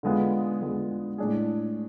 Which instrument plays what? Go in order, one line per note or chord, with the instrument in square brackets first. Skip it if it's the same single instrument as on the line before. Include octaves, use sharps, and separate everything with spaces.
[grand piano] D3 G#3 B3 F4 G#4
D3 G#3 B3 F4 G#4
A2 G#3 D4 G#4